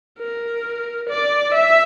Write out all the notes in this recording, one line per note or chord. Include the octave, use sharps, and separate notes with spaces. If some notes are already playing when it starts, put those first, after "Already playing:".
A#4
D5
E5